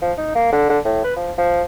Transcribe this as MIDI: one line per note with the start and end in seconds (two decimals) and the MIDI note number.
0.02 0.12 53
0.18 0.31 63
0.35 0.48 58
0.53 0.69 50
0.69 0.79 50
0.85 1.02 45
1.04 1.13 71
1.16 1.32 53
1.38 1.63 53